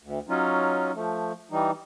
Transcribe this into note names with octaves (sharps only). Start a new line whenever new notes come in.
D2
F#3 C#4 D#4 F4
F3 A3
E3 G3 D#4